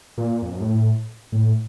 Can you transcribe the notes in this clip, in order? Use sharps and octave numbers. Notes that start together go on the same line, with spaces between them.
A#2
F2
F#2
A2
A2